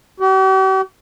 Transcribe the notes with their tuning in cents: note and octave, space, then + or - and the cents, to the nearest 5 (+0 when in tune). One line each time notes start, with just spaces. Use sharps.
G4 -45